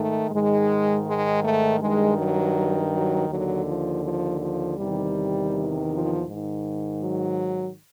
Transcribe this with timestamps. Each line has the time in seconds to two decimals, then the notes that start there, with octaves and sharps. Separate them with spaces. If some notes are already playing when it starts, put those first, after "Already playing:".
Already playing: G#2 D#3 A3
0.31 G#2 D#3 G#3
1.05 G#3
1.43 A3
1.80 G2 D#3 G#3
2.17 F#3
2.92 F#3
3.29 D#2 D3 F#3
3.66 F3
4.04 F3
4.41 F3
4.78 E2 C3 D#3 G3
5.91 F3
6.27 G#2 D#3
7.02 F#3